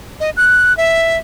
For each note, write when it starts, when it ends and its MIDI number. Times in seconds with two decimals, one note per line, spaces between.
0.20 0.30 75
0.37 0.76 90
0.77 1.18 76